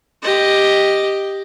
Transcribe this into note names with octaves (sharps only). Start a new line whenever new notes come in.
G4 D#5